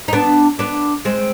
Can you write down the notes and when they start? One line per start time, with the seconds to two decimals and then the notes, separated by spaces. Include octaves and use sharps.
0.08 D#4
0.13 B3 D4
0.59 B3 D4
1.05 G#3 C4